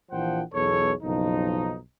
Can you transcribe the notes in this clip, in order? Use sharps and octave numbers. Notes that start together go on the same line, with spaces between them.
A#1 E3 F3 C5 F#5 G5
B1 E2 G#4 A4 C#5
F#1 B1 F3 D#4